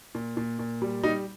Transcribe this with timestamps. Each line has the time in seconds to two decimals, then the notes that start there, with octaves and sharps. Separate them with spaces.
0.15 A#2
0.37 A#2
0.59 A#2
0.82 G3
1.03 G3 D#4